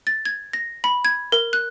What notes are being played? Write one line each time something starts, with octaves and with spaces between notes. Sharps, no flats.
A6
G#6
A#6
B5
G#6
A#4
F#6